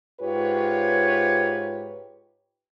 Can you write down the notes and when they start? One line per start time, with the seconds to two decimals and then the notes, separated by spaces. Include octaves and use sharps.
0.21 G#2 F4 G4 B4 C#5